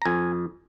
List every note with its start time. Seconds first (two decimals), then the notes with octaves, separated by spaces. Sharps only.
0.02 A#5
0.05 F2 G#5